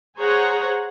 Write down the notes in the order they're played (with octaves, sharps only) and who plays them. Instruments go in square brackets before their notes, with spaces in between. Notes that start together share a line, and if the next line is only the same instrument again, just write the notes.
[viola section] G#4 C5 C#5 F#5 A#5